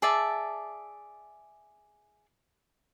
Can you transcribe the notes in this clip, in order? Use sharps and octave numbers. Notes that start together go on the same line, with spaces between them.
G#4 D5 E5 A5